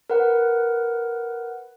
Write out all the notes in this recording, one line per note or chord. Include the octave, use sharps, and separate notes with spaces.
A#4 B4 F#5